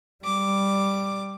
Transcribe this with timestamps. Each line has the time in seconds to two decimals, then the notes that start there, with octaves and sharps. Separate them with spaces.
0.25 G3 D6